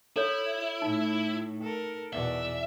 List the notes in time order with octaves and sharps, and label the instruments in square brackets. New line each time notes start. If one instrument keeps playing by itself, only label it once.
[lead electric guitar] E4 [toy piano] A4 C#5
[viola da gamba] A2 A3 [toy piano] D#4
[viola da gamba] A4 A#4
[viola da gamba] E2 B2 D5 [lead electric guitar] E5